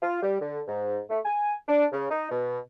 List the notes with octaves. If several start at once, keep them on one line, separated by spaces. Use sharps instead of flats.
F4
G3
D3
G#2
A3
G#5
D4
C#3
D#4
B2